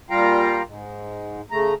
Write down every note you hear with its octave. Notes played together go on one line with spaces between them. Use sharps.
A#2 G3 F4 F5 G5 A#5
G#2
C#3 A3 A#5